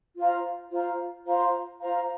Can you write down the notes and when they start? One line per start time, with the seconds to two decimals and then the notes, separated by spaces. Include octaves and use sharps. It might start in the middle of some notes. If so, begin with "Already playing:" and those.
0.17 F4 C5 F5 A#5
0.71 F4 C5 F5 A#5
1.26 F4 C5 F5 A#5
1.80 F4 C5 F5 A#5